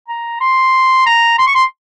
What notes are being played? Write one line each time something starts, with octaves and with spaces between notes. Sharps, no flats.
A#5
C6
A#5
C6
C#6
C6